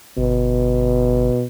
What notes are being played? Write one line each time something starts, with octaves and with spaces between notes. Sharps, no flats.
G1 B2